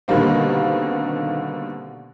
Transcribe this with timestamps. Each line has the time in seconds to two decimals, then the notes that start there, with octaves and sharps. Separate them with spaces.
0.08 B2 D3 D#3 G3 A#3 C4